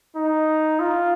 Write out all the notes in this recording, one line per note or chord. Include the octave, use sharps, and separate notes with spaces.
D#4
F4